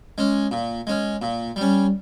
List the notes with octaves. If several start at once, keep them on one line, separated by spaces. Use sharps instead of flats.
G#3 C#4
A#2
G#3 C#4
A#2
G3
C#4